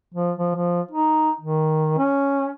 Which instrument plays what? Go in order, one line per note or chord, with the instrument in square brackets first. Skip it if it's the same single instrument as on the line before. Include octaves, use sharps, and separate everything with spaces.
[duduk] F3
F3
F3
D#4
D#3
C#4